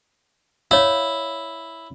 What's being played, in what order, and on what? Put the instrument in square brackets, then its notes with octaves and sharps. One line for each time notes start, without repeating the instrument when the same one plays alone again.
[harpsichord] E4 [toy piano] C#5 F5